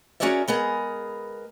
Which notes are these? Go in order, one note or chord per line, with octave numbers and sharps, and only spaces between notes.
C#4 F#4 G#4 A#4 D5 E5
G#3 B3 G#4 A#4